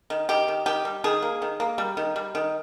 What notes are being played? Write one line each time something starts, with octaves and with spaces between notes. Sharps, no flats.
D#3
D#3 G4
D#3
D#3 G4
G3
D#3 G#4
A#3
D#3
A#3
G3
D#3
G3
D#3